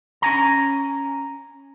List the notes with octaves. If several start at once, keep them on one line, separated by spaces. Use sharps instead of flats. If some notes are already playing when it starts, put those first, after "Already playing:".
C#4 G#5 A#5